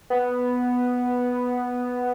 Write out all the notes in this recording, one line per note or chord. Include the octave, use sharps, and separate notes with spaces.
B3